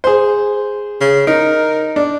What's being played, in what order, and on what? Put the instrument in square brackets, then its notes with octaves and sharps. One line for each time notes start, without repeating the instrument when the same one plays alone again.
[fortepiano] G#4 C5
[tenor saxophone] C#3
[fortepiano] D#4 [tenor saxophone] A#4
[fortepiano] D4